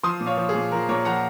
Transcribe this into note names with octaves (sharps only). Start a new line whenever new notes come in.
F3 C6 D#6
A#2
C#5 F5
F3
G#4
A#2
F3 A#4
A#2 A#4 C#5
F3 F#5 A#5